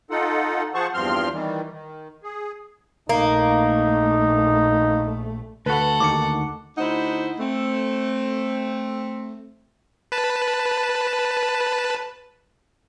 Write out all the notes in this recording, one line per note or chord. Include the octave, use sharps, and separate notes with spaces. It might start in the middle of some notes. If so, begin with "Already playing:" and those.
D#4 F4 A4 F#5
F3 G#4 C5 F#5 A5 C#6
E2 G2 F3 C4 C6 F6
D#3 E3 G3
D#3
G#4
A#1 A3 A#3 D#4
D2 F#4 A4 B4 F#5
D#2 D#3 D6 C#7
D2 D#4 E4 C5 F#5
A3 C4
B4 A5